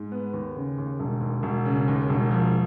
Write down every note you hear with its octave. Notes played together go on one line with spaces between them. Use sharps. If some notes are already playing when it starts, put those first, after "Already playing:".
Already playing: G#2
B3
D#2
C#3
D#2
E1
D#2
E1
C#3
D#2
E1
F3